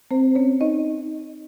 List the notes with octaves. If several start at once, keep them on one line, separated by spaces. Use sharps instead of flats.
C4 C5
C#4 C#5
D#4 D#5